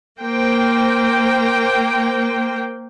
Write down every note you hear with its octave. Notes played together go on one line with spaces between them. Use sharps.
A#3 C5 G5